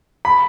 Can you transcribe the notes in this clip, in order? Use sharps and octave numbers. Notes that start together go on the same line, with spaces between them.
B5